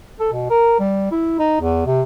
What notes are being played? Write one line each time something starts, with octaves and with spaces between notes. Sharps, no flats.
A4
B2
A#4
G3
E4
D#4
E2
C3